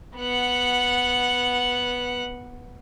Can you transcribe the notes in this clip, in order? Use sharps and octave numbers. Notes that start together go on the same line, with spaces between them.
B3 F#5